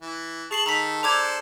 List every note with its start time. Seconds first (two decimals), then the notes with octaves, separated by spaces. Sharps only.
0.02 E3
0.51 G#4 A5 C#6 C7 F#7
0.66 D#3 A4 A#5 B6
1.03 D4 A4 C5 A#5 D6 G#6